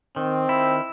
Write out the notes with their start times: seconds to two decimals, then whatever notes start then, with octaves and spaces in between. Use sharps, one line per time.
0.16 D#3 C4
0.49 E4